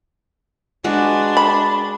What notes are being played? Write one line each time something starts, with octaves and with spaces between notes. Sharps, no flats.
G#3 D4 F#4 B4
B5